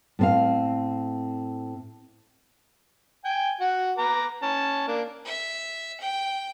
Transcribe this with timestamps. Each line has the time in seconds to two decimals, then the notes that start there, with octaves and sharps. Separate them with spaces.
0.19 A2 C4 F5
3.24 G5 G#5
3.60 F#4 F#5
3.98 B4 A#5 D6
4.42 C#4 A5
4.88 A#3 D4
5.25 E5
6.00 G5